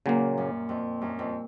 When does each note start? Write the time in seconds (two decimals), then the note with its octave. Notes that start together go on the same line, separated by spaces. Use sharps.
0.06 A#2 C#3 F#3 A#3
0.38 F#2
0.69 F2
1.01 F#2
1.19 F2